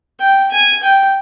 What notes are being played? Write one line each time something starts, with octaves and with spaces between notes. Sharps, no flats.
G5
G#5
G5